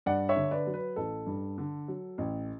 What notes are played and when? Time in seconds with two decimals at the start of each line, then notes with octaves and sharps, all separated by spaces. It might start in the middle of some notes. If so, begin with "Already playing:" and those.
0.06 G2 D5 F#5
0.29 C#5 E5
0.36 D3
0.51 B4 D5
0.67 F#3
0.74 B4
0.96 A1 A4
1.27 G2
1.58 D3
1.88 F#3
2.18 A1